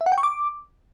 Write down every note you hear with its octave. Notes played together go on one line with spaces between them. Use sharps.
E5
F#5
G5
C#6
D6